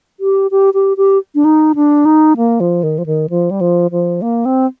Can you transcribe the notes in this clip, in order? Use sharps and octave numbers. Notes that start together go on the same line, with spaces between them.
G4
G4
G4
G4
D4
D#4
D4
D#4
A#3
F3
D#3
F3
D#3
F3
G3
F3
F3
A#3
C4